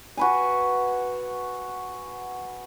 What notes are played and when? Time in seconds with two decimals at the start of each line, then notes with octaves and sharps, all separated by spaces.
0.17 F#4 B4 G#5